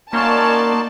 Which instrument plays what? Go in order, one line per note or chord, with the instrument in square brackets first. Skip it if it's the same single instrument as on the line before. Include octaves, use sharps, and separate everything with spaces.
[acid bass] A#3 [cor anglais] C#4 [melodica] D#4 F#4 C6 [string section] D5 A5